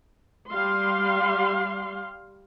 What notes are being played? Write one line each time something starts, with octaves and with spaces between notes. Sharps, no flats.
G3 F5 C6